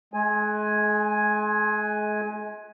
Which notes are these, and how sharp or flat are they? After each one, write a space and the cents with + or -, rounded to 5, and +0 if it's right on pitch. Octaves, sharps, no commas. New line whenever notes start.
G#3 +35 G#5 +0